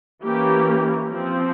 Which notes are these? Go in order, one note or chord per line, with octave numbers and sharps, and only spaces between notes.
E3 A#3 C#4 G4
F3 C4